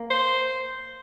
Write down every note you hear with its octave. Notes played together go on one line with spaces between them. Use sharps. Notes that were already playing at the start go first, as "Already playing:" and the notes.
Already playing: A#3
C5